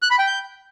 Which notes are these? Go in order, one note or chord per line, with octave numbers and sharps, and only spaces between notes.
F#6
B5
G5
G6